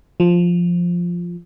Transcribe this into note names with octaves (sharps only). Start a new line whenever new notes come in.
F3